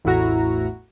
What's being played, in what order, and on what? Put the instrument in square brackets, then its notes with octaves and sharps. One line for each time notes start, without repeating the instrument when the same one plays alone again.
[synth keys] A1 E2 A2 E4 F#4 A#5